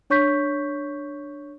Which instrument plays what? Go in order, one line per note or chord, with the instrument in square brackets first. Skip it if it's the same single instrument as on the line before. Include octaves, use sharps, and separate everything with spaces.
[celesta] D4 C#5 C#6 G6 B6